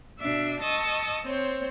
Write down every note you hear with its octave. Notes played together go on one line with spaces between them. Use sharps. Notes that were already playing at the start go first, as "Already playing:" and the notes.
B2 D4 E5
D#5 A5 C#6 D#6 E6
C4 C5 C#5